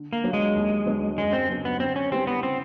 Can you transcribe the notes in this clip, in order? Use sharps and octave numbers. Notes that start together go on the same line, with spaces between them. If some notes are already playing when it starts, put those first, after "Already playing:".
Already playing: D3
A#3
F#3 B3 D4 F4
G#3
D#2
D3 F#3 B3 D4
F#2 G#3
C4
C#3 F#3 B3 D4
B3
D3 C4
C#4
G3 B3 C4 E4 G4
B3
C#3 C4